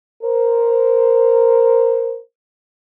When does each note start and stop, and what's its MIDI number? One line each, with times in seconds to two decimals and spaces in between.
0.23 2.20 70
0.23 2.20 72